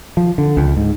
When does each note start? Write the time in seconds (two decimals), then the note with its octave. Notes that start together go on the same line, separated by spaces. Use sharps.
0.17 F3
0.38 D3
0.57 C#2
0.77 G#2